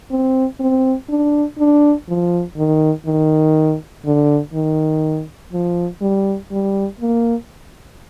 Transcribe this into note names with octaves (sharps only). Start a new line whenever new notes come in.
C4
C4
D4
D4
F3
D#3
D#3
D3
D#3
F3
G3
G3
A#3